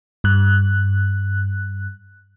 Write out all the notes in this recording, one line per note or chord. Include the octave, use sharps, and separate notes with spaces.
G2 F#6